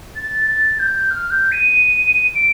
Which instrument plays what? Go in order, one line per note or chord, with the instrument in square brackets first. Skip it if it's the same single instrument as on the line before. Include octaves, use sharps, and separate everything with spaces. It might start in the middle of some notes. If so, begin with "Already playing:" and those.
[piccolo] A6
A6
G6
F6
G6
D#7
D7